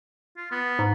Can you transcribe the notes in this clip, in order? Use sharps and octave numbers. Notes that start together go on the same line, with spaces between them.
F4
B3
G#2